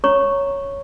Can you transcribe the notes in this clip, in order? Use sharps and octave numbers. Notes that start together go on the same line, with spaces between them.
C#5 A#5 C#6